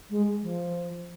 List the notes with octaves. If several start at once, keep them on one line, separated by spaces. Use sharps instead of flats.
G#3
F3